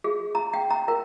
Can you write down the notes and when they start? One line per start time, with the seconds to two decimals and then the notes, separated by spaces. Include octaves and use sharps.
0.04 G#4
0.35 A#5
0.54 G5
0.71 A#5
0.88 A#4